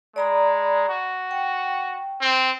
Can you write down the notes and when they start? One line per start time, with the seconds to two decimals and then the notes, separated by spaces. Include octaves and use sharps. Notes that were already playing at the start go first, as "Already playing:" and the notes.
0.16 G#3 D5 A#5 B5
0.89 F#4
1.31 G5
2.21 C4